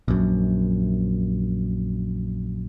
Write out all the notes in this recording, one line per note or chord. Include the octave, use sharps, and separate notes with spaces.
A#1 F#2